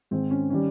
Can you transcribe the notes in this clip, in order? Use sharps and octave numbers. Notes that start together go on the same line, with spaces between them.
G#2 D#3 G#3 C4
C#4
D#3 G3 C#4